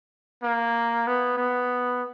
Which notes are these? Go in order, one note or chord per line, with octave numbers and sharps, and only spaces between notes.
A#3
B3
B3